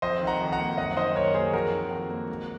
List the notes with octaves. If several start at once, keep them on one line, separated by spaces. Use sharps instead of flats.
F2 C5 D#5
D#3
F#5 A#5
F2
F#5 A#5
A#3
F#2 D#5 F#5
D#3 C5 D#5
F#2 A#4 C#5
A#3 G#4 C5
F2 F#4 A#4
D#3
F2
A#3
G#2